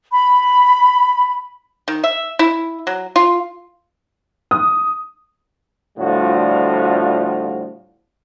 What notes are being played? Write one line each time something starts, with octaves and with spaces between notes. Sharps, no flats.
B5
D#3
E5
E4
F#3
F4
D#6
A2 D3 F3 G3 F4 F#4